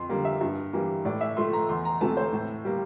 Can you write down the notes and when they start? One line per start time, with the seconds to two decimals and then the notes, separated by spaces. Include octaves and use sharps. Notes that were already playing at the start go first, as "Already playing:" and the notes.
Already playing: F2 C6
0.09 D3 G3 A#3
0.25 E5
0.41 G2
0.73 E3 G3 A#3
1.05 A2 D5
1.21 E5
1.37 F3 A3 C6
1.53 A#5
1.69 E2 C6
1.85 A#5
2.01 C3 E3 A3 A5
2.17 C5
2.33 A2
2.65 G3 A#3